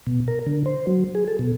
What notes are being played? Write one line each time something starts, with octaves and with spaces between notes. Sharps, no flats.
B2
A#4
D3
C5
F#3
G#4
A4
B2